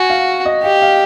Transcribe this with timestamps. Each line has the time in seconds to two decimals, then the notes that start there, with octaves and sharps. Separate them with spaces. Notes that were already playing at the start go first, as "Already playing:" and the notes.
Already playing: F#4 G#5
0.10 F5
0.46 D#5
0.63 G4 F5
0.82 F5